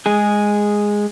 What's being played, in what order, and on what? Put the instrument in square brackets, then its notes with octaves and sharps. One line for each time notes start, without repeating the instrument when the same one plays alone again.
[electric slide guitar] G#3 G#4